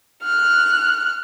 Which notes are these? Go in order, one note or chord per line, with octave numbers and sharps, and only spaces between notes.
F6 F#6